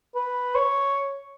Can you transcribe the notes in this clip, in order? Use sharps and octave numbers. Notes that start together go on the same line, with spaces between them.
B4
C#5